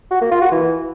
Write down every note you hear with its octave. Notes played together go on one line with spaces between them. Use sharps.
F#4
A#3
F4
F#4
E3